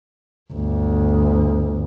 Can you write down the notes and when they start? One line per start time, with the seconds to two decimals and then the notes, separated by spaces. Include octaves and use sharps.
0.53 G1 D2